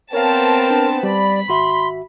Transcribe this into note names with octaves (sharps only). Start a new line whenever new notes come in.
B3 C4 A#4 C#5 F5 A5
D4
G3 D5 B5
G#1 F#4 E5 C6